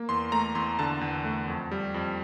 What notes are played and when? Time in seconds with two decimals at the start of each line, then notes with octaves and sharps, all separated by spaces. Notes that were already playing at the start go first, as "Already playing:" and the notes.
Already playing: A#3
0.09 E2 C6
0.32 A3 A#5
0.55 E2 C6
0.79 D3 A5
1.01 E2
1.25 A3
1.48 F2
1.71 G3
1.94 F2